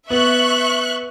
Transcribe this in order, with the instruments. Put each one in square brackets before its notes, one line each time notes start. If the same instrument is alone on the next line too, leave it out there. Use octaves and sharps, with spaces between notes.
[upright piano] B3 [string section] E5 C#6 F#6